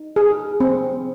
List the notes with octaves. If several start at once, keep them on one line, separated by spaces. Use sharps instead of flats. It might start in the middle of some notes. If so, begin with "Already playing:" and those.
Already playing: D#4
G#4
C4